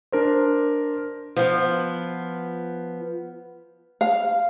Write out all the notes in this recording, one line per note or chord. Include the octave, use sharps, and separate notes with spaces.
D4 A#4 C5
F3 B3
F5